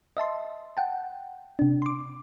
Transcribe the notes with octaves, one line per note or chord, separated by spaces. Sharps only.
D#5 E5 A5 C6
F#5 G5 A5
C3 D4
C6 D6